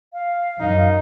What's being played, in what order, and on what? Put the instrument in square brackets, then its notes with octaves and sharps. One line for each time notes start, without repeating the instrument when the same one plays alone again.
[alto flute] F5
[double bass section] F#2 [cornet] D#4